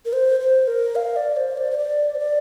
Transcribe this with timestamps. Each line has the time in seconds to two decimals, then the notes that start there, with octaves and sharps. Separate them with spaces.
0.05 A#4
0.13 C5
0.40 C5
0.67 A#4
0.96 F5
1.16 D5
1.37 C5
1.57 D5
1.71 C5
1.78 D5
2.15 C5
2.20 D5